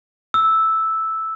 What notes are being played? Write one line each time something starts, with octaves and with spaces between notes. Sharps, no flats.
E6